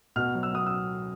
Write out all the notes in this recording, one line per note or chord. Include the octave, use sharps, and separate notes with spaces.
B2 F6
F#3
E6
F#3 D#6
E6